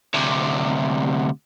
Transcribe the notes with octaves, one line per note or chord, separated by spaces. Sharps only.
D2 C3